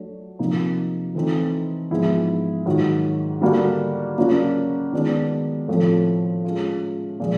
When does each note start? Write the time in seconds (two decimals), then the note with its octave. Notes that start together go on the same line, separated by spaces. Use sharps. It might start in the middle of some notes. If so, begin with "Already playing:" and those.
Already playing: F#3 A3 D4
0.39 C3 F3 A#3 D#4
1.15 E3 A3 C4 D#4
1.91 G#2 F3 G#3 B3 E4
2.66 G#2 D#3 F#3
3.41 D3 G3 A#3 D4 F#4
4.18 C#3 F#3 A#3 D4 F#4
4.93 D#3 G#3 B3 D4
5.68 A2 F3 A3 C4
6.44 G#3 C#4 F4
7.20 A#2 F3 G#3